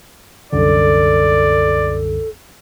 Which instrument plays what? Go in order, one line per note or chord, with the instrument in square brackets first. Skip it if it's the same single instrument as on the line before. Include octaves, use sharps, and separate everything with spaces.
[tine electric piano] C2 F#2 D3 [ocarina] A4 [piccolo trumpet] D5